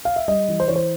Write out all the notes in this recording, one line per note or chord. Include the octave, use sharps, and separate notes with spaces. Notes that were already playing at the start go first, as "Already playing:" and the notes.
F5
E5
G3 D#5
E3
C5
E3 C#5
C5